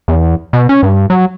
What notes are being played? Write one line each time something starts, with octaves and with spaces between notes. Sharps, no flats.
E2
B2
C#4
G2
F#3